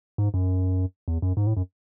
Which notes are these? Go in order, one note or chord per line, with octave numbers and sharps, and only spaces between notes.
G#2
F#2
E2
F#2
G#2
A2
F#2